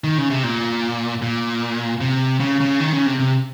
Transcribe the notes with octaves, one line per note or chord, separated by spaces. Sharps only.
D#3
C#3
C3
A#2
A#2
C3
C#3
C#3
D#3
C#3
C3
C3